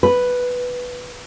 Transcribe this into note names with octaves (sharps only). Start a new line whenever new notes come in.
B4